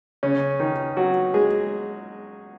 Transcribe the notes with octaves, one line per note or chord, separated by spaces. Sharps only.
C#3 C#4
D#3 D#4
F#3 F#4
G#3 G#4